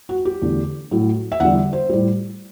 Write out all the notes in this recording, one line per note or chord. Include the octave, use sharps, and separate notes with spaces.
F#4
G4
E2 D3 A3
A2 F#3 A3
E5
E2 D3 G3 F#5
C5
A2 G3